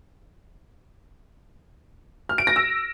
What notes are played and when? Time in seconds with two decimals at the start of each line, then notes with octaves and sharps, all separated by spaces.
2.29 F6
2.38 D7
2.47 A#6
2.56 E6